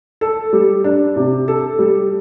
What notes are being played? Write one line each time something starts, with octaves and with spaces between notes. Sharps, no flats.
A4
G3
D4
C3
A4
G3